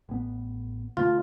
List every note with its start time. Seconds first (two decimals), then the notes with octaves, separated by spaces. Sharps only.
0.09 A1 B3
0.97 D2 B2 A3 F4